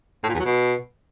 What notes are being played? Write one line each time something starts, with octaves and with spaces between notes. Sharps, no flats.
A2
A#2
E2
F#3
B2